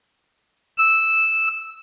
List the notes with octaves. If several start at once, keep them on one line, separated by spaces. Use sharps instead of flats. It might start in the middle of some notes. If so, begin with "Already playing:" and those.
E6